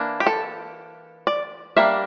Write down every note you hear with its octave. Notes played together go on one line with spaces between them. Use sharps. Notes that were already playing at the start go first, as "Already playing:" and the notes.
Already playing: E3 A#3 D4
G4
A4
D5
G3 A#3 D4 E5